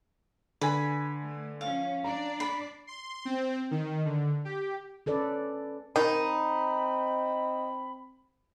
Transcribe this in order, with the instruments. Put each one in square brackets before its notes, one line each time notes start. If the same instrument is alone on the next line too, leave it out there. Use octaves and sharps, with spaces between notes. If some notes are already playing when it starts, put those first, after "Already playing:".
[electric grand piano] D3 B4 G#5 [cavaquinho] B5
[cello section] A3
[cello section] F3 C#4 [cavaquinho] F5
[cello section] D4 D5 [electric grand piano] A#5
[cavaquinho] B5 [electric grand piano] C7
[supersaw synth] C6
C4
D#3
D3
G4
[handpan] C#4 A4 B4 D5
[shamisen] D#3 [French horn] C4 [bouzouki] D#4 [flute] B5